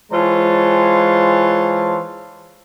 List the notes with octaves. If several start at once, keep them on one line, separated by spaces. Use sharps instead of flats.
E3 G#3 F4 C5 C#5 A5